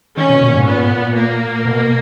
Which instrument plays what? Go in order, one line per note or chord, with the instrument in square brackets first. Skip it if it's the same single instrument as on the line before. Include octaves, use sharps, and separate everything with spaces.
[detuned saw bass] D#3 [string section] C#4
[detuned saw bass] B2
A#2
G#2
[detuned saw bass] A#2 [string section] B3
[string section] A#3
[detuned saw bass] B2